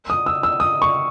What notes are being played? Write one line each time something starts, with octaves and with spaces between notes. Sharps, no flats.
D#6
E6
E6
D#6
C#6